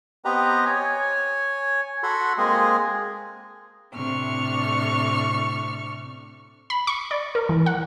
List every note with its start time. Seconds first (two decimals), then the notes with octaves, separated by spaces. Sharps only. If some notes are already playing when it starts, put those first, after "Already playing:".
0.25 B3 C4 G4 B4 D#5 A#5
0.65 C#5 G#5
2.03 F#4 A4 F#5 B5 C6
2.38 G#3 A#3 C4 G#4 D#5 G#5
3.93 A2 C3 D4 C#6 F6
6.70 B5
6.87 C#6
7.11 D5
7.35 A#4
7.49 E3
7.66 F#5